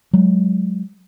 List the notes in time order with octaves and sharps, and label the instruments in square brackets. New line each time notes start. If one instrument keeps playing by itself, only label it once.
[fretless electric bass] F#3 G#3